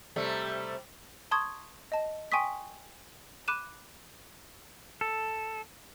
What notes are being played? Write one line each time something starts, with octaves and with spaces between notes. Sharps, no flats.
C3 G3 A3
A5 C6 C#6 D#6 G#6
D#5 A5
G5 G#5 C6 C#6 D#6 B6
B5 D6 F#6 D#7 E7
A4